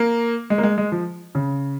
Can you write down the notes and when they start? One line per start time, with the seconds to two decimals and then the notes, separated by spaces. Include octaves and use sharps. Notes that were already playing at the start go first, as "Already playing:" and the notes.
Already playing: A#3
0.50 G#3
0.58 A#3
0.63 G#3
0.78 G#3
0.92 F3
1.35 C#3